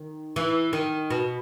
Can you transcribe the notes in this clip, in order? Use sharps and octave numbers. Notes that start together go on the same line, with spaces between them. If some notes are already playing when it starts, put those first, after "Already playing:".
Already playing: D#3
E3
D#3
B2